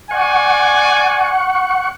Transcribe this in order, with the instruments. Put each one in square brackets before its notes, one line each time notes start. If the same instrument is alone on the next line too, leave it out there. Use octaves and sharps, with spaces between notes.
[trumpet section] D5 G#5 [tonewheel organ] F#5 C#6